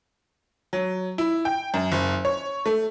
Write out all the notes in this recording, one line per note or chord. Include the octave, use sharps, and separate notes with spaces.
F#3
E4
G5
F#2
F#1
C#5
A3